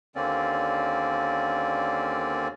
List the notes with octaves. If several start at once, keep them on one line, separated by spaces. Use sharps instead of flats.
D#2 D3 A#3 C4 C#4 D5